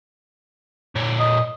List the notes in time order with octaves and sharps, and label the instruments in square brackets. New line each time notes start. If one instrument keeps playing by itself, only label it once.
[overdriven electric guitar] A#2 C#5
[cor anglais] D#5